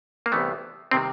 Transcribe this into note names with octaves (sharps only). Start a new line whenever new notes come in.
A#3
C2 C3 E3 A3 B3
C3 D#3 G3 C4